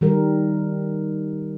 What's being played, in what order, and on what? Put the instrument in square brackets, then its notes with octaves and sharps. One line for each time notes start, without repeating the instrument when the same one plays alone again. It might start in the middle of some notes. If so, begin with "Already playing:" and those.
[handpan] D#3 G3 A#4